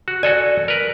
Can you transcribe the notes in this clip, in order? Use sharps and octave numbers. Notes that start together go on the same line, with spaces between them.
F#4
F#4 A4 D5 G#5
A#4 B4